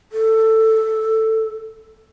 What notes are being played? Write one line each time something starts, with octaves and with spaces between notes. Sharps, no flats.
A4